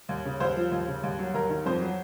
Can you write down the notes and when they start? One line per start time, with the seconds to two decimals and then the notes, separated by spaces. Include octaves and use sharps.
0.09 D#2
0.25 C#3
0.40 D#2 C5
0.56 F3
0.72 D#2
0.88 C#3
1.03 D#2
1.19 F#3
1.34 D#2 A#4
1.50 D#3
1.66 F2 C5
1.81 F#3